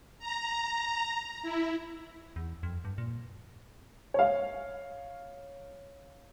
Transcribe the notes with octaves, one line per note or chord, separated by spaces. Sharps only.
A#5
E4
E2
F2
G2
A#2
C#5 F5